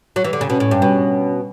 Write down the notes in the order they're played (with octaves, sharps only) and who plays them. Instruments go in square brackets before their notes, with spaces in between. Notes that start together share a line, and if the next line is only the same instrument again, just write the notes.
[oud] F#3
E3
D3
C#3
[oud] B2 [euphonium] C#4
[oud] A2
G2
B2